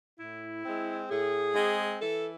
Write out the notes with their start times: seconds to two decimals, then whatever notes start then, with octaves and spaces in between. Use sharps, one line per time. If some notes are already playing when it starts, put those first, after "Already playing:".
0.19 A2 E4
0.65 G#3 C4
1.10 A2 G#4
1.56 G#3 C4
2.00 E3 A4